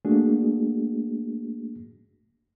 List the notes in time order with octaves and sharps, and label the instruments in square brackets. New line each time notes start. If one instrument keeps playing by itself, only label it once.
[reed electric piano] A3 A#3 D4 F#4 G#4